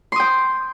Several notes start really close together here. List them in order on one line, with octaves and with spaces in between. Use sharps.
C6 D#6 G5